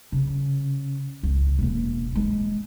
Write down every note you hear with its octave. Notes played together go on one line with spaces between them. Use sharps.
C#3
C#2
E1 A#3
G#2 G#3